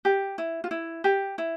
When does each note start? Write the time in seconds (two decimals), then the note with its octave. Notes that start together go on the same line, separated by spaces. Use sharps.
0.05 G4
0.38 E4
0.64 F4
0.71 E4
1.04 G4
1.38 E4